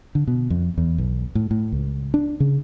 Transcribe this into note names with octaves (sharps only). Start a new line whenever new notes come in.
D3
B2
F2
E2
B1
A2
A2
C#2
D4
C#3